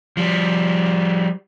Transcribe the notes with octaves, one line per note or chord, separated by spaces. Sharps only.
F3 G3